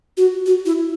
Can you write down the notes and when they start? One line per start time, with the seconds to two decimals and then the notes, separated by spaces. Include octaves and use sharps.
0.17 F#4
0.46 F#4
0.66 E4